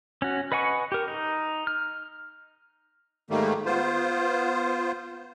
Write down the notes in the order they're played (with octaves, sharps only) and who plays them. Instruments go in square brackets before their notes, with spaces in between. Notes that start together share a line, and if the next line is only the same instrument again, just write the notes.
[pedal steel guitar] C#4 F#4
B4 D#5 F#5 G#5 C#6
G4 A#4
D#4
F6
[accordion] G#2 D#3 G3 A3 A#3
B3 F4 C5